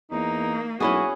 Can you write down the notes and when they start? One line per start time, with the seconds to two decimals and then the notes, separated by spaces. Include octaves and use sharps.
0.11 E2 A#3 D#4
0.80 B1 C#4 E4 F#4 G#4